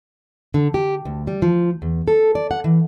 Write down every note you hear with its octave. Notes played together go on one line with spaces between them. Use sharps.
D3
G4
D2
G3
F3
E2
A4
D5
F#5
E3